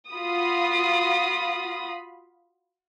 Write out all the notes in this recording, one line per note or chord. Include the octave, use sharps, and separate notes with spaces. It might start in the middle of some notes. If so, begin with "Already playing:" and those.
F4 F#4 F5 B5 D#6